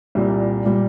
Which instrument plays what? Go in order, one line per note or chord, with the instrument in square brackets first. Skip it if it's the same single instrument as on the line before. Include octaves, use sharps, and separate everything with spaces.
[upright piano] C2 A#2 G3
A#2 G3